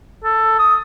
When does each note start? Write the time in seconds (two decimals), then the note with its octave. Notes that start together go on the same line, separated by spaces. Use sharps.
0.24 A4
0.60 D#6